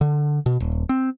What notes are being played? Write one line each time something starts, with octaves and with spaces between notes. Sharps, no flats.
D3
B2
D#1
C4